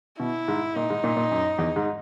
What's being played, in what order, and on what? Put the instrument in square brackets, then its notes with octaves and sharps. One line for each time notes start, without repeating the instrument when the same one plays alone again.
[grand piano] B2 [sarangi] E4
[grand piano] G#2
[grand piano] A#2 [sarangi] D#4
[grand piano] G#2
A#2
A#2
F#2
E2
G#2